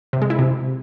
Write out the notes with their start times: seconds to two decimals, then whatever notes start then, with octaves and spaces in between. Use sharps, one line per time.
0.13 C3
0.22 G#3
0.30 E4
0.39 C3